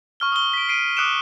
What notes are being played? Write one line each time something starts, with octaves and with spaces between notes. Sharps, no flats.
C#6 F6 G7
D#6 G7
B6 D7
C7 D7 D#7
D6 D#6 F#6 C#7 D7 E7